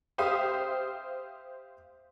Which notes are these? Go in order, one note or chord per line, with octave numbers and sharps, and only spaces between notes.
G4 C5 E5 F5 D#6